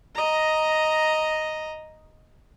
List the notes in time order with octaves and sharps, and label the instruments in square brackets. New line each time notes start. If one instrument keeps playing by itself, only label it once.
[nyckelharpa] D#5 A#5